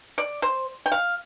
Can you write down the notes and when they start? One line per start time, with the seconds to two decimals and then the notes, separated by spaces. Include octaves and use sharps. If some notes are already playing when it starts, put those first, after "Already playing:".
0.18 D5
0.42 C5
0.86 G5
0.92 F5